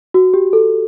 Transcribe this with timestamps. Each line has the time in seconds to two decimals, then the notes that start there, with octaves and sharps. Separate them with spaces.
0.14 F#4
0.34 G4
0.53 A4